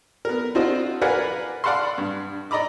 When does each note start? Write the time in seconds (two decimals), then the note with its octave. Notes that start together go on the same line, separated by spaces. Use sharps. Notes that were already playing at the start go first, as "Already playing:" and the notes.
0.25 B3 A#4
0.55 C4 D4 F4 F#4 C5 D#5
1.02 A#4 B4 D5 F5 F#5 G#5
1.64 D5 F5 F#5 A5 B5 C6
1.98 G2
2.51 D5 D#5 A#5 B5 D6